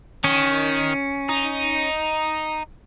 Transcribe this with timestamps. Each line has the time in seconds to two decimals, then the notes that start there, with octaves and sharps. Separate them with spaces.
0.24 D#3 C#4
1.29 D#4